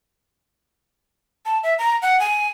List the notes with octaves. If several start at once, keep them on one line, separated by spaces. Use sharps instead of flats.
A5
E5
A#5
F#5
G#5